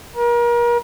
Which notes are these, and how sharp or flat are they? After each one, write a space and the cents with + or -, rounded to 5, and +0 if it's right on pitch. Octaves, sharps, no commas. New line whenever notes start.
A#4 +35